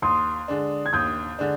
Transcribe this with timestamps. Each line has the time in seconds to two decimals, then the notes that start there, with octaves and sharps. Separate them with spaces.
0.02 D#2 C6 D#6
0.48 D3 G#3 D4
0.86 G#6
0.93 D#2 D#6 G6
1.39 D3 G#3 D4